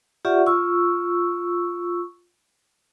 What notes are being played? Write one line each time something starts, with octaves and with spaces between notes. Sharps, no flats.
F4 G4 D5 E5 F#5 C#6
F4 C#6 E6